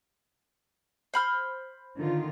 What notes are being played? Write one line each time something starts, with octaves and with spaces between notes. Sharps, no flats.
C5 B5 F6
D3 D#3 F4